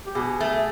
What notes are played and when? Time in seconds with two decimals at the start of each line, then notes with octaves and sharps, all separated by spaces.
0.06 G4
0.15 B2 G#4
0.41 A3